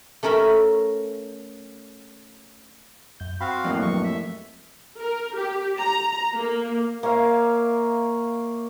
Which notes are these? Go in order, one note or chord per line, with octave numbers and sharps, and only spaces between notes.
A3 C#4 A#4 E5 B5
F#2 G6
C4 F#4 F5 B5 C6
F2 A2 A#3
G2 F#3 C#6
E5
A#4
G4
A#5
A#3
A#3 C#5 E5 F5